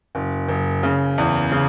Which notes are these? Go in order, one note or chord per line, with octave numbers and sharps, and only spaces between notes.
F#1
F#1
C#3
E2
C#3